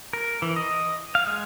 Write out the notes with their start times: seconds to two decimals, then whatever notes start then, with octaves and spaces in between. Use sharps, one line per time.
0.13 A#4
0.42 E3
0.56 D#5
1.15 F5
1.27 G#3